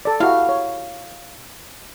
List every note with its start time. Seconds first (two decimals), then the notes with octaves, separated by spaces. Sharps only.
0.05 A4 D5
0.20 E4 F#4 G4 F5
0.49 C#5